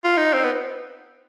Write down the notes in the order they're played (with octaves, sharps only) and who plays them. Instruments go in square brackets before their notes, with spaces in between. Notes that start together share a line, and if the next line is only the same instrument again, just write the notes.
[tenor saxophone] F4
D#4
C4
B3